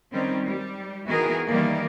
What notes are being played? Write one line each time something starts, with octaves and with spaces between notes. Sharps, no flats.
D#3 G3 C4 C#4
G3
D#3 E3 B3 F#4 G#4 A#4
D#3 E3 G3 A#3 D5